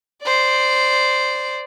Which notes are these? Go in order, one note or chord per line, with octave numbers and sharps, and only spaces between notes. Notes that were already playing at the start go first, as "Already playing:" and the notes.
C5 D5